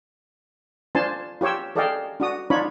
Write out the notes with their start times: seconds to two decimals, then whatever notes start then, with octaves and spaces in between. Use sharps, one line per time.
0.95 D4 F4 C5 G#5 A5 C6
1.41 F4 G4 C#5 G5 E6
1.76 G#4 A4 D5 D#5 F5 G5
2.20 D4 F#4 D#6
2.50 D4 D#4 F4 C#5 B5